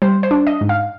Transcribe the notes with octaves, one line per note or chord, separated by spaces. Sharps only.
G3 C5
C5
D4
D#5
G#2
F5